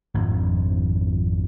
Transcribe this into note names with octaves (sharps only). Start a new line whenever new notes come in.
G#1 F2 G#2 D#3